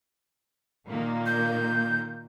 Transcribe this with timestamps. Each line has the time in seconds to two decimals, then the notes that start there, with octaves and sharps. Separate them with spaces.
0.87 A#2 D#3 A#3
1.26 G6